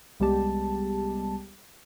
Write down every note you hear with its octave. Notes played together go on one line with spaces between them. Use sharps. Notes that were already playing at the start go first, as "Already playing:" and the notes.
C2 G3 G#3 B3 G4 A5